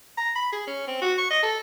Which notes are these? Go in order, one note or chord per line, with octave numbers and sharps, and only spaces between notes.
A#5
B5
G#4
C#4
C4
F#4
C#6
D#5
A4